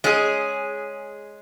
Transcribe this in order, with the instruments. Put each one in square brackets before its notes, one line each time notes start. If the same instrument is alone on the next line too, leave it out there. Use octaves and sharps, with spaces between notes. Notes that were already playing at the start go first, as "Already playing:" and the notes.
[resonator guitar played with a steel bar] G#3 C#4 G#4